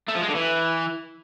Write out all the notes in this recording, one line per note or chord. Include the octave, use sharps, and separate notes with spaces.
A3
F3
G#3
D3
E3